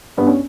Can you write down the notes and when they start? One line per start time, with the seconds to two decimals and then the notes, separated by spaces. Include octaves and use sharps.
0.17 G2 B3
0.27 C#4